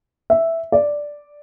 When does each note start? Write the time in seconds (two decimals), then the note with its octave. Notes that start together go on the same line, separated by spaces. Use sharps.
0.30 E5
0.72 D5